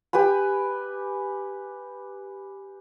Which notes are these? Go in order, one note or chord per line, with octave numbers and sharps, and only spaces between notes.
G4 B4 G#5 B5